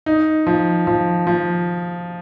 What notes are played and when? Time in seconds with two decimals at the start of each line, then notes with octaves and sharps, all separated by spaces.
0.06 D#4
0.47 F3
0.87 F3
1.27 F3